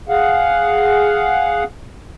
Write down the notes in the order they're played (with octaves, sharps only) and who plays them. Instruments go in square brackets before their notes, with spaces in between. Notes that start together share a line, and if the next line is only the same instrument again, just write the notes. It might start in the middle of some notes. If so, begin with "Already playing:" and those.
[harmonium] G#4 F5 F#5